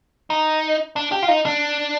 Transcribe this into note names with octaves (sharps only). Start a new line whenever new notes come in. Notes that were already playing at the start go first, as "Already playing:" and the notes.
D#4
D4
G4
F4
D#4
D4